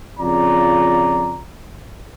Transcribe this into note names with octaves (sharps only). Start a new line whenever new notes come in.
F2 C#3 F4 D5 A#5